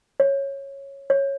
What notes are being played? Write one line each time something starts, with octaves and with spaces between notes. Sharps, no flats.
C#5
C#5